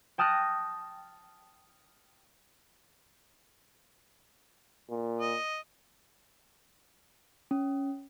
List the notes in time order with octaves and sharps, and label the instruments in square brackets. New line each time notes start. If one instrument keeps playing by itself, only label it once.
[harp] G5 A5 D#6 F6 F#6 A#6
[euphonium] A#2
[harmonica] D#5
[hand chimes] C#4